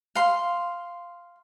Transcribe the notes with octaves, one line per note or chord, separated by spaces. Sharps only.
F5 C6